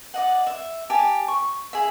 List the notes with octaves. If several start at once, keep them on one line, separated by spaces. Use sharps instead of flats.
D5 D#5 F#5
E5
G4 G#5 A5
C#6
G#4 E5